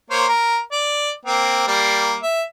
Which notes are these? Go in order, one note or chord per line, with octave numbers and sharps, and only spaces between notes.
A#3 C5 C#5
A#4
D5
A#3 C4
G3 A#3
E5